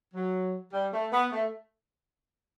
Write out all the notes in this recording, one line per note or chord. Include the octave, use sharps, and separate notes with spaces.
F#3
G3
A3
B3
A3